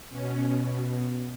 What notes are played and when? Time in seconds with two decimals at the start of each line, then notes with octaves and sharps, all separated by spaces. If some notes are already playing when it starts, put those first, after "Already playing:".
0.10 B2 C#4